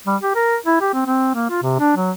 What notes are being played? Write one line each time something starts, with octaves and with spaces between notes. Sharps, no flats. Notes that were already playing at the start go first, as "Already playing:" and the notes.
G3
G4
A#4
E4
G4
C4
C4
A#3
F4
C3
D4
F#3